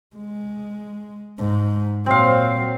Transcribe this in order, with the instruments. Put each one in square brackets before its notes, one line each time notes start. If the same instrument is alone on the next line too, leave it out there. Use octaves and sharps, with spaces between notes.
[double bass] G#3
G#2
[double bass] A#2 F#3 [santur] C4 F5